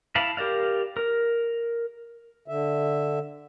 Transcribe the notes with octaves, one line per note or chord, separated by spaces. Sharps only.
E4 F5 A5 B5
G4 A#4 D5 F5
A#4
D3 E5